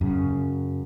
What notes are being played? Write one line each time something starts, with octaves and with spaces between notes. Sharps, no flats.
F#2 C#3